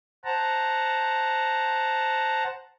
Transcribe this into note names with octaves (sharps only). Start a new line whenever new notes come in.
C5 F#5 A5 A#5